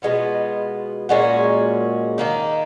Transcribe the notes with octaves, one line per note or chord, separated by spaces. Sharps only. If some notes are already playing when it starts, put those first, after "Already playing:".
B2 G#3 B3 F4
A#2 G#3 C#4 F#4
D#3 A#3 D#4